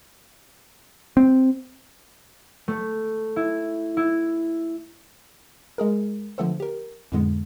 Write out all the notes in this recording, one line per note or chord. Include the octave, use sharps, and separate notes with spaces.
C4
A3
E4
E4
G#3 G#4 A#4
D3 F3 A3 B3 A4 C5
G4 A#4
F2 A2 D3 G#3 B3